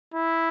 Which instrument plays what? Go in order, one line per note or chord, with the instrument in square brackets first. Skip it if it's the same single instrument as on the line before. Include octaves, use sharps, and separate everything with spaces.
[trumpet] E4